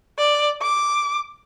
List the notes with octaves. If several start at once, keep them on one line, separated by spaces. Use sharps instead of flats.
D5
D6